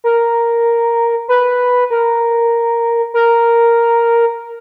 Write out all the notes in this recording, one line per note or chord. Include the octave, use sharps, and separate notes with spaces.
A#4
B4
A#4
A#4